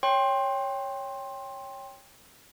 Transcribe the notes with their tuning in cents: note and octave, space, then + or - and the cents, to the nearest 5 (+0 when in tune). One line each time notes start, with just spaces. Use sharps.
C#5 +0 G5 +10 C6 +15